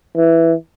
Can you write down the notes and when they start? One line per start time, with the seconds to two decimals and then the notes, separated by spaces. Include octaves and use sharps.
0.17 E3